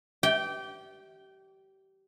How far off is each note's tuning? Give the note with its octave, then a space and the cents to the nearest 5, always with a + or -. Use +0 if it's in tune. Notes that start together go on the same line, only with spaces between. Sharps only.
G4 -25 G5 +0